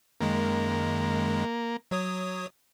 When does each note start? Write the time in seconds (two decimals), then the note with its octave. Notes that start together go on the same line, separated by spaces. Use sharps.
0.21 F#2 D#3 G#3 A#3
1.91 F#3 C#5 D#6